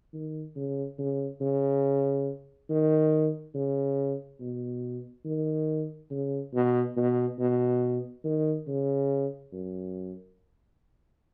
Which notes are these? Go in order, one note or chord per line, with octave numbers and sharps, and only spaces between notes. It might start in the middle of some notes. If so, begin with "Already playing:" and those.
D#3
C#3
C#3
C#3
D#3
C#3
B2
D#3
C#3
B2
B2
B2
D#3
C#3
F#2